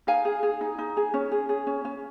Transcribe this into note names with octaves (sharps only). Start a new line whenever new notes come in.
D#4 F5 G#5
G#4
G#4
D#4
D#4
G#4
C#4
G#4
G#4
C#4
C#4